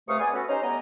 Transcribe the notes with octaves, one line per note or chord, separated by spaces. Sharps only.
C#2 C3 A3 F5 C#6 D#6
B3 G#4 D5 G#5
B3 C#4 F#4 A4 B4
C#4 D#4 G4 C5 A#5
G3 A3 B3 D#5 G#5 A#5